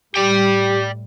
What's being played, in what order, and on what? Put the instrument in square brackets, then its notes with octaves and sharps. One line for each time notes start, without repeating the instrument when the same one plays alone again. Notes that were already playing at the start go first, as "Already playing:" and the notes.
[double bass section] A2 G3 [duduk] G4 [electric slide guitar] D5 G5